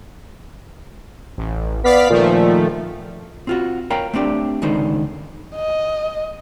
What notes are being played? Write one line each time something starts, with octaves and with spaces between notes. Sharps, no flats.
A1
B3 D5 F5 B6
A#2 D#3 F3 A3
C4 F4 F#4
A#4 C#5 F5 G5 A#5 B5
A3 C4 D4 G4
C#2 D3 D#3 G#3 D#4 C5
D#5